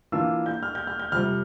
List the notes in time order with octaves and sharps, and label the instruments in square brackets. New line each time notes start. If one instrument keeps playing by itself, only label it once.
[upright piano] E3 A#3 D4 F4 [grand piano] E6
[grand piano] G6
F6
G6
F6
G6
[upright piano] F2 C3 G3 [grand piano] F6